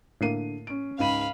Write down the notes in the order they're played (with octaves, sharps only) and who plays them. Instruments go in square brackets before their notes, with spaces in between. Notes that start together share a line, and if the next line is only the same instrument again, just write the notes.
[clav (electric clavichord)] A2 A#3 [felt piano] D3 C7 D#7
[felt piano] C#4 D7
[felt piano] C#2 G#2 D#7 [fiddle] F5 B5